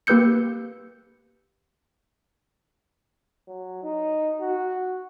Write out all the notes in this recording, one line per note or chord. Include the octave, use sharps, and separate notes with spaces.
A#3 G4 B4 E6 G6 C#7
F#3
D#4
F#4